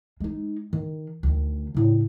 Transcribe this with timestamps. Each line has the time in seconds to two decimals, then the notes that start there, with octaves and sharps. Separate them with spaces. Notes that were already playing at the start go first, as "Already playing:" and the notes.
0.20 G#3 D#4
0.73 D#3
1.23 D2 D#3
1.74 A2 C#3